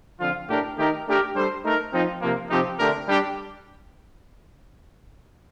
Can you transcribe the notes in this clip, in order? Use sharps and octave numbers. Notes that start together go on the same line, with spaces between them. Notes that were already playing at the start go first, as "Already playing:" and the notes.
D3 F3 C4 F4
A2 A3 D4 G4 A#4
D#3 A3 D#4 G4 A#4
A3 D4 G4 A#4
G3 D4 A4 C5
A3 D#4 A#4
F3 C4 D#4
C3 F3 A#3
C3 F3 C4 D#4 G4
D3 A3 D4 G4 A#4
G3 D4 G4